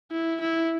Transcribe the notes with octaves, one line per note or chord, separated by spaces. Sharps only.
E4
E4